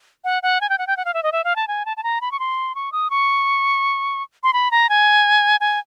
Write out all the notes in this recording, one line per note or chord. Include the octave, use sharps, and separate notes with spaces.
F#5
F#5
G#5
G5
F#5
G5
F#5
F5
E5
D#5
E5
F5
A5
G#5
A5
A5
A#5
B5
C#6
C6
C#6
D#6
C#6
C6
B5
A#5
G#5
G#5